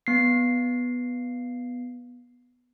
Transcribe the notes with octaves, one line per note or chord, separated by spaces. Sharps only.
B3 C7